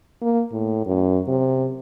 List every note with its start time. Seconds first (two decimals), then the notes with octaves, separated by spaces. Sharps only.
0.22 A#3
0.52 A2
0.86 F#2
1.27 C3